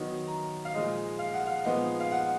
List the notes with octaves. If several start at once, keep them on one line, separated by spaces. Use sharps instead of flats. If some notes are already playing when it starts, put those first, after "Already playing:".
Already playing: D#3 F#3 B3 D#4
A#5
F5
A#2 F3 G#3 D#4 D#5
F5
F#5
F5
A#2 F3 G#3 B3 D#4
F5
F#5